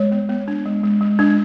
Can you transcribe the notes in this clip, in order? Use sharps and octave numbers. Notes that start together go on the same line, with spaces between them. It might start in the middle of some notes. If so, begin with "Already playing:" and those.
Already playing: G#3 C#5
B3
B3
D4
G#3
G#3
G#3
G#3 D4